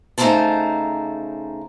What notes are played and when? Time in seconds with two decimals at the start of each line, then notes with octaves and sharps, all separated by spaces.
0.18 C#3 A3 D#4 A#4 C5 A5